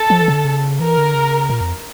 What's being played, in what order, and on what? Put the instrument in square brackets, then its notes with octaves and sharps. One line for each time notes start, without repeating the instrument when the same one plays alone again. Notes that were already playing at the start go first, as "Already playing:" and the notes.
Already playing: [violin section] A4
[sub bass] F3
E3
C#3
D3
C#3
[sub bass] E3 [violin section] A#4
[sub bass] D3
C#3
A#2
F2